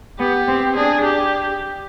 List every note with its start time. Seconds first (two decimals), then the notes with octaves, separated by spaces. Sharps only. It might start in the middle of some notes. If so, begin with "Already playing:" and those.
0.19 B3 G4
0.47 C4
0.76 D4 G#4
1.04 G4